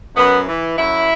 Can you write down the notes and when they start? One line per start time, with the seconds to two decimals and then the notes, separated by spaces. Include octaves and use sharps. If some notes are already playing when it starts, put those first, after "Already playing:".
0.16 F#2 B3
0.47 E3
0.78 F#2 E4